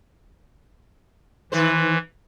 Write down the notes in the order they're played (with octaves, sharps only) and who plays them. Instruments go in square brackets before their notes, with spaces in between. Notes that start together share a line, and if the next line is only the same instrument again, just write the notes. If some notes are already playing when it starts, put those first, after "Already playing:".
[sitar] D#3 B4 C5 [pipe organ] E3